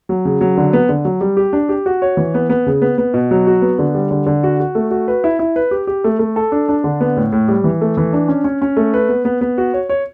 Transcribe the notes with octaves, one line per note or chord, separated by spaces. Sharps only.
F#3
C#3
F#3
D3
B3
D3
F#3
G3
G4
D4
G4
F#4
C#5
E3
B3
B3
C#3
B3
B3
B2
F#3
F#4
B3
D3
G3
D3
D3
F#4
F#4
A3
F#4
B4
E4
E4
B4
G4
G4
A3
A3
A4
D4
D4
D3
B3
A2
A2
G3
E3
A3
E3
D4
C#4
C#4
C#4
A3
B4
B3
B3
B3
F#4
C#5
C#5